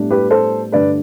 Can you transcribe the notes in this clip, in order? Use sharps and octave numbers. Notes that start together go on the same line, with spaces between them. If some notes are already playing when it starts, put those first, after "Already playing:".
Already playing: A2 G3 B3 D4
G4 B4
A4 C5
G2 D3 A3 B4 D5